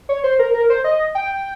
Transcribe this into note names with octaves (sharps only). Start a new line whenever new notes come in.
C#5
C5
A#4
A#4
C5
D#5
G5